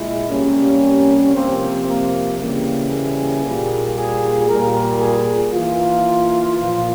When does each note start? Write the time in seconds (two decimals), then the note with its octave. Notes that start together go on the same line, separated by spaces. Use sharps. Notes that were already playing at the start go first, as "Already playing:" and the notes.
Already playing: A#2 G#3 E4
0.29 C3 G3 A#3 C#4
1.34 C3 F3 A#3 C4
1.86 A#3
2.38 C#3 E3 G3 A#3
2.90 G#4
3.43 A#2 G3 A#3
3.95 G#4
4.47 A#2 G3 A#3 A#4
4.99 G#4
5.51 E3 A#3 F4
6.56 A#2 F3 A#3